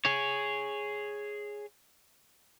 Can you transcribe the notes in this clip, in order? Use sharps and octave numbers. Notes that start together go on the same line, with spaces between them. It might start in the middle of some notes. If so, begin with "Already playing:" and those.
G#4 C#5